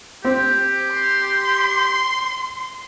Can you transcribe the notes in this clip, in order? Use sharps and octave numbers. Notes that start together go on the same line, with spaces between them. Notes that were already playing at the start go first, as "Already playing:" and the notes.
C4 G4
C6